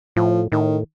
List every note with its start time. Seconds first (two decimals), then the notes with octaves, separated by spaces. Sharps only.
0.16 A2 F3
0.52 A2 D#3